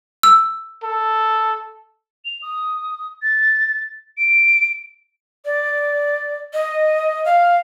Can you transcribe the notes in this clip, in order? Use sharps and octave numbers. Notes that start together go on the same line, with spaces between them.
E6
A4
F7
D#6
A6
D7
D5
D#5
F5